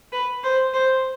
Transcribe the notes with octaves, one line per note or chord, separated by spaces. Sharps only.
B4
C5
C5